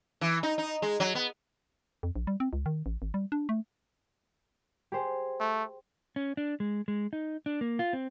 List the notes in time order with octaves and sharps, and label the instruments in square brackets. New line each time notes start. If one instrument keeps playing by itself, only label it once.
[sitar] E3
D#4
D#4
G#3
F#3
B3
[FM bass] F2
A#1
G3
C4
C#2
D#3
A1
G#1
G3
D4
A3
[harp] G4 G#4 C5
[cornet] A3
[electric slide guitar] C#4
D4
G#3
G#3
D#4
D4
A#3
F4
C4